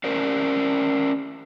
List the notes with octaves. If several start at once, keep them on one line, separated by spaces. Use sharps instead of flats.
C#4 A#4 C5 D5